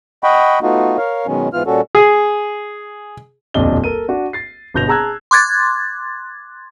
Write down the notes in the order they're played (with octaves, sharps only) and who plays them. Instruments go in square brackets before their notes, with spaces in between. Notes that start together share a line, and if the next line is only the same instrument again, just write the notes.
[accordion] D#5 F#5 G5 B5 C#6
A3 B3 D#4 F4 F#4
A#4 C#5 F5
B2 D#3 F#3 G#3 B3 C#4
G#2 E3 B3 F4 F6
A#2 G3 C#4 F#4 A4
[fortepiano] G#4
[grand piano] D#1 B1 F2 D4 D#5 G7
A4 A#4 D#7
D4 F#4
A6 C7
G1 B2 G6 A#6 F7
G#4 A5 A#5 E6 F#6 G#6
[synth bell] C6 D6 F#6 G#6 A6